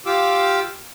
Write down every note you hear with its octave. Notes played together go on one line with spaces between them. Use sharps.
F4 G4 F5 D6 E6